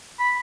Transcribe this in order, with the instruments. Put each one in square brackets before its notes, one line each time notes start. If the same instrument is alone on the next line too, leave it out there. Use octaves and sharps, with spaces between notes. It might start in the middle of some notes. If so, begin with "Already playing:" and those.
[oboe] B5